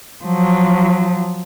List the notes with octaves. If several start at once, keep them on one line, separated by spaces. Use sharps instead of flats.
F3 F#3